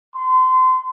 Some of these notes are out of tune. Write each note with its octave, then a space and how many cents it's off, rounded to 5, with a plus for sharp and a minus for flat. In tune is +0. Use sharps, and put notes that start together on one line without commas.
C6 -30